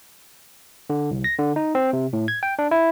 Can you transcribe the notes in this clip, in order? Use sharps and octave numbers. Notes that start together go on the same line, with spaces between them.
D3
C2
A#6
D3
D#4
C4
C3
A2
G#6
G5
D4
E4